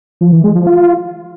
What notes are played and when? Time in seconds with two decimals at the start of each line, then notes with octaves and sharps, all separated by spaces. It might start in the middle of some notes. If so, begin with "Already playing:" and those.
0.21 F3
0.32 E3
0.44 G#3
0.55 F3
0.67 F4